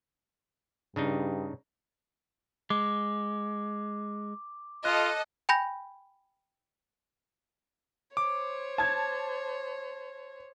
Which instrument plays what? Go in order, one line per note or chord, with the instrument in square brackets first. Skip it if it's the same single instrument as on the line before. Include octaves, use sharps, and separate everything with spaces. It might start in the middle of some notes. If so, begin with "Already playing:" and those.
[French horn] G2 [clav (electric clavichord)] C#3 D4 D#4
[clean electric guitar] G#3 [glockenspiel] D6
[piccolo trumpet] F4 [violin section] A4 D#5 [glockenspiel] F#6
[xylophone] G5 G#5 B5 G6 A#6
[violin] C5 C#5 [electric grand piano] D6
[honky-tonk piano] A5 G#6